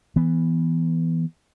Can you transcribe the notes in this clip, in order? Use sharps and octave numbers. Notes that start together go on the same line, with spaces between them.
E3 B3